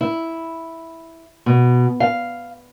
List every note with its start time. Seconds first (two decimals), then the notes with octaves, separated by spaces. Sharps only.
0.01 E4
1.46 B2
2.00 F5